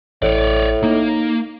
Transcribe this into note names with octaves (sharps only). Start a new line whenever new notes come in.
A1 A2 C#5 D5
A#3 D#4